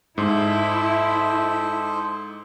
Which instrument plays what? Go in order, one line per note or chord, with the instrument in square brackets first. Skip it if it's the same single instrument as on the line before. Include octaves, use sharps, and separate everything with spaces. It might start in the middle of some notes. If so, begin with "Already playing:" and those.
[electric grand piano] G#2 [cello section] E4 [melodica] A4 C5 D#5